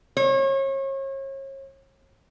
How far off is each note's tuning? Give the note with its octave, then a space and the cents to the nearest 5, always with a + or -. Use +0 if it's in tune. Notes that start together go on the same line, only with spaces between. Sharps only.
C#5 -35